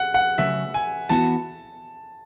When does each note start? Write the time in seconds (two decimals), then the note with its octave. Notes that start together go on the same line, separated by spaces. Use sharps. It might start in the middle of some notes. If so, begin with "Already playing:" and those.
Already playing: F#5
0.14 F#5
0.38 C#3 F#3 A3 E5
0.74 G#5
1.09 E3 B3 F#4 A5